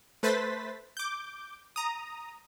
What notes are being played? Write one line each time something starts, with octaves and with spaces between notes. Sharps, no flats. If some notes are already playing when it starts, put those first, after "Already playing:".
A3 B4 C5 A6 B6
D6 G6
A#5 D#6